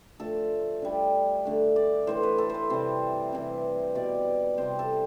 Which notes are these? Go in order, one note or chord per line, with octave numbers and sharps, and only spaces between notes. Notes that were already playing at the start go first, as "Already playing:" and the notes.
D3 F3 A3 A4
D3 G3
D3 A3
D5
A2 E3 A3 C5
B4
A4
B4 C5
C3 G3 C5
C3 E3 G3
B2 G3 D5
C3 G3 C5
A4